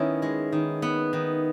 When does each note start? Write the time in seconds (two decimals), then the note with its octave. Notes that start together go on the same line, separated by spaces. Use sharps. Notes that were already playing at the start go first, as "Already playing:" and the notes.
Already playing: D#3 B3 C#4 E4
0.22 G#3
0.52 D#3
0.82 B3
1.13 D#3